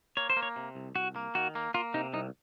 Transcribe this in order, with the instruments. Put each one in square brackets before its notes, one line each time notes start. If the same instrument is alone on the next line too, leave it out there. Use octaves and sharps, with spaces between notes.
[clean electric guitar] A#3 [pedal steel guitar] C#5
[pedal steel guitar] C5
[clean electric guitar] A#3
[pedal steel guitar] C#5
[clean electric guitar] C3
C2
[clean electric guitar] C2 [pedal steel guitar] F#4
[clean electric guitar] A#3
[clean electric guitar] D#3 [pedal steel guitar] F#4
[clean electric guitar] A#3
[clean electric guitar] A#3 [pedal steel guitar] F4
[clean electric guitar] C3 [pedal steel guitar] D#4
[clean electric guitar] C2 [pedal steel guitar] D#4